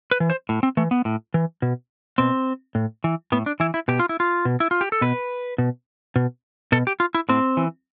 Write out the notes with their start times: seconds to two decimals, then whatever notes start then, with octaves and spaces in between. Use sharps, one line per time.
0.11 B4
0.20 E3
0.30 C5
0.49 A2
0.63 C4
0.77 E3 A3
0.91 B3
1.05 A2
1.34 E3
1.62 B2
2.18 B2 C4
2.75 A2
3.04 E3
3.32 A2 B3
3.46 D4
3.60 E3 E4
3.74 E4
3.88 B2 G4
3.99 F4
4.09 E4
4.20 F4
4.45 B2
4.60 E4
4.71 F4
4.81 G4
4.92 A4
5.01 B2 B4
5.58 B2
6.16 B2
6.72 B2 A4
6.87 G4
7.00 F4
7.14 E4
7.29 A2 C4
7.57 E3